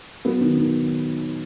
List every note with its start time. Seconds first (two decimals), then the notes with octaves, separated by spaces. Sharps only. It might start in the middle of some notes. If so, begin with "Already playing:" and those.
0.25 F#3 B3
0.41 D#3
0.57 D#3